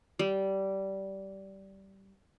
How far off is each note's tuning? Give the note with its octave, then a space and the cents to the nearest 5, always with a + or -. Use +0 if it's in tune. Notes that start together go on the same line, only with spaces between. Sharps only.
G3 -15